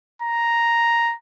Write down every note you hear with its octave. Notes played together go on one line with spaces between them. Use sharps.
A#5